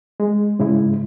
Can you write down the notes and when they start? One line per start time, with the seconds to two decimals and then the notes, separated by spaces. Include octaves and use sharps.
0.20 G#3
0.59 G#2 C#3 G#3 E4